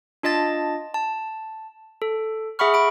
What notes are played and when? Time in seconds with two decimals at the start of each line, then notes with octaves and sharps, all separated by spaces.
0.23 D4 F4 D#5 A5 A6
0.94 A5
2.02 A4
2.59 G#4 E5 F#5 B5 C#6 F6
2.74 G#4 B5 D7